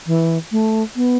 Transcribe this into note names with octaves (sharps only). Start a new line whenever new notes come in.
E3
A3
B3